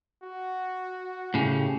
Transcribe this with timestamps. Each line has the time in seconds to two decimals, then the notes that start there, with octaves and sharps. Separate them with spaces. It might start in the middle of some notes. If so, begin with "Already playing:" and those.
0.23 F#4
1.34 A2 C#3 G4